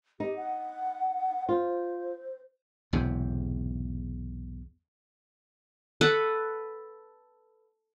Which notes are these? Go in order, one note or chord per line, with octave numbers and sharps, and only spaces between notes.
D#4 G4
F#5
F4 C5
B1 E2 G#2 C3
A4 B4 F#5